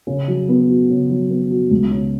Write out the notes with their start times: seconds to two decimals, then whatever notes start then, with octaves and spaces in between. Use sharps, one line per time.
0.07 C#3
0.28 F#3
0.49 B3
0.69 F#4
0.90 C#3
1.10 F#3
1.30 B3
1.51 F#4
1.71 C#2
1.91 C#3